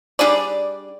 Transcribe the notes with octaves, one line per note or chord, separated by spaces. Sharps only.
G3 D4 G#4 D5